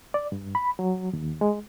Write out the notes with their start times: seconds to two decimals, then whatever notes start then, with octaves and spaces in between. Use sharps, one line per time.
0.14 D5
0.32 G2
0.55 B5
0.79 F#3
1.13 D#2
1.41 G#3